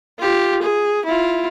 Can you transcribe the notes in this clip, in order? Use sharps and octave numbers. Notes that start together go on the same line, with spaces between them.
F4 G4
G#4
E4 F4